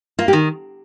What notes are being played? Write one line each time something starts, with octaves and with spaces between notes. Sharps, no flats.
A#3 F4
G4
D#3